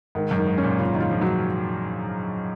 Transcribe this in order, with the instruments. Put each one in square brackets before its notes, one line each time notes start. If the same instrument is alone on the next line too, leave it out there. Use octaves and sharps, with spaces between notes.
[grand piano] G#2 [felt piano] D#3
[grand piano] F#2
[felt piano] D#3
[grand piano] G#2
[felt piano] C#4
[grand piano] A#2
[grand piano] C#3 [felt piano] F4
[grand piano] D#3
[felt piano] F4
[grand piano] F3
[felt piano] F#3